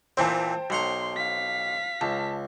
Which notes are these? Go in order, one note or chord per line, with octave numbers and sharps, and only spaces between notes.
A#2 E3 C4 C5 G5 A5
B1 F#5 A#5 C6
F5 B6
C#2 A5